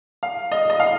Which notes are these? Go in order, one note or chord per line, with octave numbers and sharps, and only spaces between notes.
F5
D#5
D#5
F5